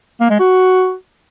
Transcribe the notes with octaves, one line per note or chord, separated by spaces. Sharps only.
A#3
G#3
F#4